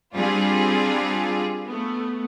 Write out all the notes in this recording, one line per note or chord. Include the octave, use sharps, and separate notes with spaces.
G3 C4 D4 F4 G#4
A3 B3